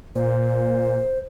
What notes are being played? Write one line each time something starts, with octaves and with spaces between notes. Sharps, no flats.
A#2 C5